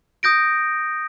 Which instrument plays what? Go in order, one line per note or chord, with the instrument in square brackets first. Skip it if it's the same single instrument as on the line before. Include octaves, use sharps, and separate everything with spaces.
[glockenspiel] D#6 G6 A#6 D7